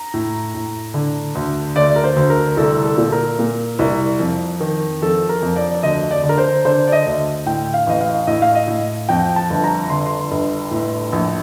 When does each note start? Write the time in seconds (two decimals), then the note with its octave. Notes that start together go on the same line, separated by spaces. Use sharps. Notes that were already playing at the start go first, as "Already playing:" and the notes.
Already playing: A#5
0.14 A2
0.54 A2
0.94 D3
1.35 D2
1.76 D2 D5
1.96 A#4
2.04 C5
2.16 D2
2.30 A#4
2.57 C2 A4
2.84 A4
2.98 A#2
3.12 A#4
3.39 A#2
3.79 C2
4.20 F2
4.60 D#3
5.02 F2 A4
5.29 A#4
5.42 F2
5.56 D5
5.74 D5
5.83 D2 D#5
6.11 D5
6.23 D3
6.29 A#4
6.38 C5
6.65 D3 C5
6.87 D5
6.92 D#5
7.06 D2
7.46 A2 G5
7.74 F5
7.87 A1 D#5
8.01 F5
8.27 A2 D#5
8.42 F5
8.55 D#5
8.68 A2
9.09 F2 G5
9.36 A5
9.50 G1
9.64 A#5
9.90 D3 C6
10.06 C6
10.31 G1
10.71 A2
11.12 A#1